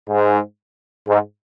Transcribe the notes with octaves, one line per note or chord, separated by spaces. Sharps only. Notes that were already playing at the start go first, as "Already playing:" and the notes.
G#2
G#2